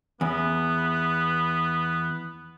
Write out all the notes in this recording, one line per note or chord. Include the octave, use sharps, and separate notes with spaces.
E2 B3